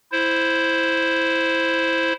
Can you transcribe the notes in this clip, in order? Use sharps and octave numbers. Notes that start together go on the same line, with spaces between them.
E4 C5